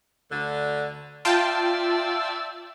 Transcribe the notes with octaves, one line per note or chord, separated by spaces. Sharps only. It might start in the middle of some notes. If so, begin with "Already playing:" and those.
D2 D3
F4 D5 E5 G5 A5